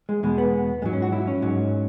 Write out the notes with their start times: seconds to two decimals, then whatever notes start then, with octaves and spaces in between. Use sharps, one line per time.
0.09 G#3
0.23 E2 B2 G#3
0.38 B3
0.82 G#2 F#3 G#3
0.93 C#4
1.02 F#4
1.12 E4
1.27 C#4
1.42 G#2 F#3